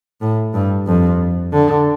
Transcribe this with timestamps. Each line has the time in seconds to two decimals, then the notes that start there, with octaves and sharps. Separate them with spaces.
0.21 A2
0.54 G2
0.87 F2
1.53 D3